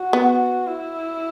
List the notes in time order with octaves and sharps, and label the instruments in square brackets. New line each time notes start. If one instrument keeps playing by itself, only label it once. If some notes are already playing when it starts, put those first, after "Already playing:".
Already playing: [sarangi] F#4
[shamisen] B3
[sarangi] E4